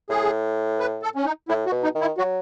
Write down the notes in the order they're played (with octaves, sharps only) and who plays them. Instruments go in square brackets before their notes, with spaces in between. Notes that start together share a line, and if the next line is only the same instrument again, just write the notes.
[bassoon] A2 [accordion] G#4
[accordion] B4
A4
C#4
D#4
[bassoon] A2 [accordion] E4
[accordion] F#4
[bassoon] B2
[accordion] D#4
[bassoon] D#3
[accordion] E4
[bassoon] F#3 [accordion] F#4